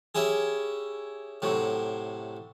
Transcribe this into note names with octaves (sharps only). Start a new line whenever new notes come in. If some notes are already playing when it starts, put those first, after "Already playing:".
C#4 E4 G4 G#4
A2 C3 F#3